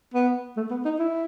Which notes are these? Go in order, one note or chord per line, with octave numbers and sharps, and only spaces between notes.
B3
A3
B3
D#4
E4